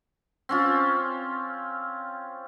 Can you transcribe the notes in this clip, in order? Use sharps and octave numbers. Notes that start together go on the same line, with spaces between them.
C4 C#4 F4